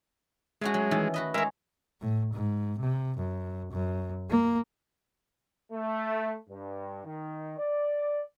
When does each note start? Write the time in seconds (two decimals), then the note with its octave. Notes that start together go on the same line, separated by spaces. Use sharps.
0.61 G#3 A3 C#4 F#4
0.74 F#3
0.91 D#3 E3 A3
1.14 F#4 B4 D#5
1.34 G#3 A#4 C#5 E5
2.01 A2
2.33 G#2
2.78 C3
3.17 F#2
3.72 F#2
4.30 A#3
5.72 A3
6.49 G2
7.05 D#3
7.58 D5